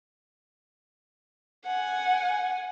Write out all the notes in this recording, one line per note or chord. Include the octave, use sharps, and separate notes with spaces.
F#5 G#5